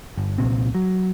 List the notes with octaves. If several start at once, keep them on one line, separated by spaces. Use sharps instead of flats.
G1
C2 A#2 C4
F#3